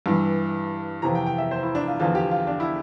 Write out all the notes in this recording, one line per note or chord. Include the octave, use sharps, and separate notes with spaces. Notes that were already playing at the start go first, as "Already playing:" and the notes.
G2 E3
F2 C3 E3 A#5
G5
G5
E5
C5
E4
D4
F4
E2 D3 F3 F4
G4
F4
D4
E4